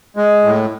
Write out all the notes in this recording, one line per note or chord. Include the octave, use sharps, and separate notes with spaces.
G#3
A2